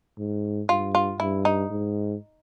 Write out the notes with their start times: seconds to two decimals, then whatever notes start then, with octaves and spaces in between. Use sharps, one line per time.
0.18 G#2
0.69 G2 F4
0.95 F4
1.19 G2 E4
1.45 D#4
1.71 G#2